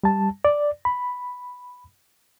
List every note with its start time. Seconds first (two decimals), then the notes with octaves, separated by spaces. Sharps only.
0.03 G3 A5
0.45 D5
0.85 B5